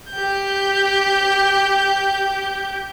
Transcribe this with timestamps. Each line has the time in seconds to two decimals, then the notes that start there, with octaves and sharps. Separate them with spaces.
0.12 G4 G6